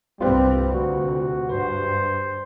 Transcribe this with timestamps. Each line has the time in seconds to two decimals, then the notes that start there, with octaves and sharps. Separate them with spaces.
0.21 C2 G2 G3 C4 F4 B4
0.73 D2 C3 F#4
1.49 G2 B4 C5